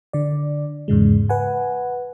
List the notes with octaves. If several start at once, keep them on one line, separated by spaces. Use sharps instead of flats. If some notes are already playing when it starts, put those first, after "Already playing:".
D3 D5
E2 G#2 C#3 G#3
B4 F#5 G#5